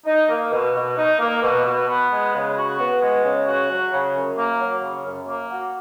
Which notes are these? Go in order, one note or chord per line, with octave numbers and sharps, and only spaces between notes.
D#4
A#3
B2
B2
D#4
A#3
B2
B2
B3
G#3
C#3
F#4
B3
G#3
C#3
F#4
F#3
C#3
F#2
A#3
F#3
C#3
F#2
A#3
F#4